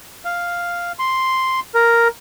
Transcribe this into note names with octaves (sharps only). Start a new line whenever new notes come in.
F5
C6
A#4